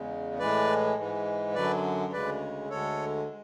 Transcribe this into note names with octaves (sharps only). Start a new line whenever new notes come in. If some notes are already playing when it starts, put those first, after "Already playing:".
Already playing: E2 C#3 G#3
A2 E3 G#3 B4 D5
G#2 E3 G#3
F#2 D3 F#3 B4 D5
D2 C#3 G#3 B4 D5
D2 D3 G#3 A4 C#5
G#3